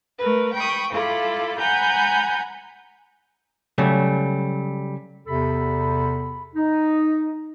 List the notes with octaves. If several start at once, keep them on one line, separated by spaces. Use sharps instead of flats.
A3 A#4 B4
G5 B5 C#6 D#6
E4 F4 A4 B5 D6
F#5 G#5 A#5 B5 G6
C#3 F#3 G3 A3
E2 C3 A4 B5
D#4